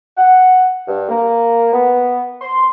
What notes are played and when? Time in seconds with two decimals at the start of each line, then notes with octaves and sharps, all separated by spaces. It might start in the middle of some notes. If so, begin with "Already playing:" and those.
0.18 F#5
0.88 G2
1.09 A#3
1.73 B3
2.42 C6